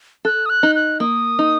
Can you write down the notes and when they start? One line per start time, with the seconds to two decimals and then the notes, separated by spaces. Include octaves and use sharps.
0.25 A4 F#6
0.46 D#6
0.50 F#6
0.63 D#4
0.75 F#6
1.00 A#3 D#6
1.39 D#4